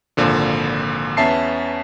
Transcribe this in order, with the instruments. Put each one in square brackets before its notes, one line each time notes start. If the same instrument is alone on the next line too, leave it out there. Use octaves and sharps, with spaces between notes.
[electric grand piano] G#1 A#2 D3 F3
E2 B3 C#4 E5 A5 C7